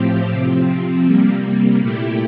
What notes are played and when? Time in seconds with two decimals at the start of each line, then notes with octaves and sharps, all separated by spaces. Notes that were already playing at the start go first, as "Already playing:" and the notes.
Already playing: A2 F3 C4 G4
0.31 C3 F3 C4
1.05 C3 G3 A#3
1.79 A#2 A3 E4 G4